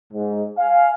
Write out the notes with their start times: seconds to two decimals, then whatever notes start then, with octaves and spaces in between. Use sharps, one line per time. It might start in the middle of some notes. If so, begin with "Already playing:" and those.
0.13 G#2
0.57 F5 G#5